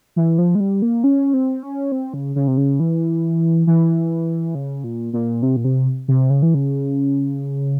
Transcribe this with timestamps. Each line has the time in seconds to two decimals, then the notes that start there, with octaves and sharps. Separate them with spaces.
0.16 E3
0.38 F3
0.55 G#3
0.60 G3
0.82 A#3
1.04 C#4
1.34 C4
1.63 C#4
1.92 C4
2.14 C#3
2.36 C#3
2.47 C3
2.57 C#3
2.80 E3
3.67 E3
4.55 C#3
4.84 A#2
5.13 A#2
5.43 C3
5.56 A#2
5.64 C3
6.08 C3
6.30 C#3
6.42 E3
6.54 C#3